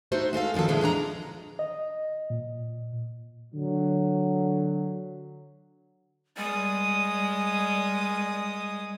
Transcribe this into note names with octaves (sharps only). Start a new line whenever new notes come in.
A3 D#4 F#4 C5
G#3 C4 A4 F5
D3 D#3 F3 A#3 A4
A#2 D3 E3 G#3 E4 F4
G2 G#3 D4 A#5
D#5
A#2
D3 F#3
G3 G#3 D#6